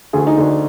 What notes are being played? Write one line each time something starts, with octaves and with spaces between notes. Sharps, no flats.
D2 G#4
D#4
D2 D4